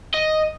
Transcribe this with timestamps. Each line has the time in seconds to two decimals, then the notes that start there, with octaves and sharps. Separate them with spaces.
0.14 D#5